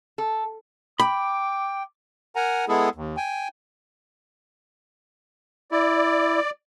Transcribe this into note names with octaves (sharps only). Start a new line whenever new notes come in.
A4
G5 B5 D6
A#4 F#5 G#5 A#5
G#3 B3 E4 G#4 A4
D#2
G5 G#5
E4 D5